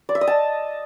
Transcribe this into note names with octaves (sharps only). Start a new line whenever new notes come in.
D5
E5
D#5
A5